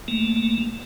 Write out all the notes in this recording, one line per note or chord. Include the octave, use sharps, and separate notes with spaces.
A3 A#3